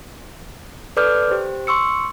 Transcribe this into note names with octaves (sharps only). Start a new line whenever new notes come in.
A4 B4 D5 D6 F6 G6
G4 C5
C6 C#6 E6 C#7